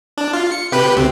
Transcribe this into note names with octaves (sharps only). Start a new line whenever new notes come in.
D4
F4
C#7
C3 G4 B4
D2 C4